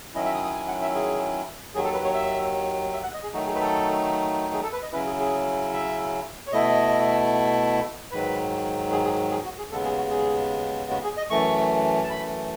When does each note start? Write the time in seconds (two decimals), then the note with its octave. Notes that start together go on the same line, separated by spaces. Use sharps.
0.15 D#3 F#3 C#4 E4 D#5
0.25 E5
0.35 D#6
0.45 D#6
0.55 G#5
0.67 F#5
0.82 E5
0.95 G#4
1.74 D#2 D#3 F#3 G#4
1.84 A4
1.94 B4
2.04 C#5
2.14 E5
2.93 E5
3.03 F#5
3.14 D#5
3.23 G#4
3.33 D#3 F#3 A3 D#4 F#4
3.46 G#4
3.55 B4
3.60 A4
4.53 G#4
4.63 A4
4.73 B4
4.83 D#5
4.92 C#3 F#3 C#4 E4 B4
5.07 G#4
5.20 G#4
5.73 E5
6.47 C#5
6.52 B2 A3 E4 D#5
8.11 G#2 D#3 F#3 B4
8.92 G#4
9.05 G#4
9.31 G#4
9.45 F#4
9.58 G#4
9.71 D#2 C#3 G#3 B3 A4
9.85 G#4
9.97 F#4
10.11 G#4
10.91 F#4
11.04 G#4
11.17 D#5
11.30 F#2 E3 A3 C#6
12.03 A5
12.10 B5